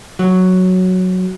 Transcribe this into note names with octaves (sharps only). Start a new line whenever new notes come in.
F#3